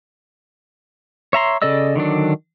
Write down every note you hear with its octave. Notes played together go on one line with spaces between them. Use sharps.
C#5 E5 A#5 C6
C#3 A4 D5 D#5 E6
D3 D#3 F#3 D4